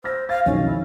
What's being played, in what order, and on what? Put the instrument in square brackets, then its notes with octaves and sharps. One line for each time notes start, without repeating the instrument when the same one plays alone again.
[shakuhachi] C5 [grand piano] E6 F6 A#6
[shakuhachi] F5 [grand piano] A6
[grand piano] B1 F2 D#3 [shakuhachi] C#4
[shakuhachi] E4